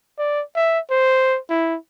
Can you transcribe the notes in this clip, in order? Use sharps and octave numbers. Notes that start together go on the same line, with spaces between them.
D5
E5
C5
E4